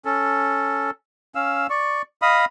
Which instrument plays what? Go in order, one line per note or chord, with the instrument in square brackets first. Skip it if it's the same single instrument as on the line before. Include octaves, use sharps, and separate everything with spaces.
[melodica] C#4 A4
C#4 F5 E6
D5 C#6
D#5 F5 B5 D#6